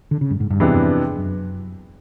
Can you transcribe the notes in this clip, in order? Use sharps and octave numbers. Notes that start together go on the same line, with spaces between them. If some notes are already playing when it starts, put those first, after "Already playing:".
D3
C#3
G2
G#2
G2
E2 C3 E3 G#3 B3 D4
F2
F#2